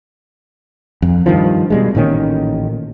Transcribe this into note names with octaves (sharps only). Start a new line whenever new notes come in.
F2
G2 D#3 F3
B2 G3 G#3
A1 A#2 D#3 C#4